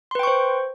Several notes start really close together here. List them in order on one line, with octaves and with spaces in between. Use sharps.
C6 B4 G5 C#6 C5